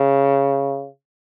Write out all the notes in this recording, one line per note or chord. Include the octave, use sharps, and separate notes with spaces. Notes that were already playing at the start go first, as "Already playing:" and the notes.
Already playing: C#3